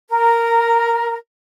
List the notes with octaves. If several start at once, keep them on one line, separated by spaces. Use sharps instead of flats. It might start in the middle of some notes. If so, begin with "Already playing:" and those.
A#4